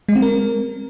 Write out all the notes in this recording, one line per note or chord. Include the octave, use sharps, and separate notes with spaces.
G#3
C4
A#4